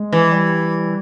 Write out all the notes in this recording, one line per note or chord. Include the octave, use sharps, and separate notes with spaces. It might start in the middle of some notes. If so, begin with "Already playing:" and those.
Already playing: G#3
E3
G3